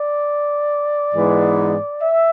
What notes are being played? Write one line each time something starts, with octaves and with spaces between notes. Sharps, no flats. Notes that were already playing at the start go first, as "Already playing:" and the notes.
Already playing: D5
G#2 E3 G#3 B3
E5